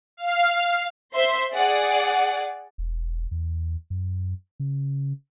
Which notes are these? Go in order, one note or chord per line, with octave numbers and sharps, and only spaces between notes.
F5
C5 E5 C6
G#4 D5 F#5
E1
E2
F#2
C#3